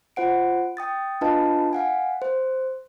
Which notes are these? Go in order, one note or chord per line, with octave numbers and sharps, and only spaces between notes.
F4 C5 F#5 D7
G5 D#6 A6
D4 F4 B4 D#5 F5 A5
F5 F#5 G#5
C5